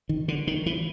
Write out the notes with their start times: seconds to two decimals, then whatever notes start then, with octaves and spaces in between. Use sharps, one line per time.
0.09 D#3
0.28 D3
0.47 D#3
0.66 E3